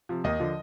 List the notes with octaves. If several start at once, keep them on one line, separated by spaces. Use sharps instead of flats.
C3 F3
D#2 D#5
D3 F3